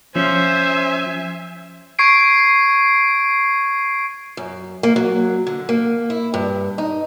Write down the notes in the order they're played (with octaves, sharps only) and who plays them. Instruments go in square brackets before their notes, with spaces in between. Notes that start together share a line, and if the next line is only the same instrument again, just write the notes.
[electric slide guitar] F3 C#4 [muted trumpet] C5 [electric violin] E5 G#5
[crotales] C#6 G#6 C7 D7
[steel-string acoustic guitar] F#2
A#3
F#3
D3
A#3
E4
G2
D#4